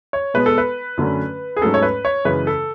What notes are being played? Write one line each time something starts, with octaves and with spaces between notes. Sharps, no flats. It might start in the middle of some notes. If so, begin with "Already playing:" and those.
C#5
B2 G#3 B3 B4
A4
B4
F#2 D3 F#3 A3 C#4
G#4
G#2 F#3 A3 C#4 A4
C#5
B4
C#5
F#2 C#3 E3 G#3 B4
A4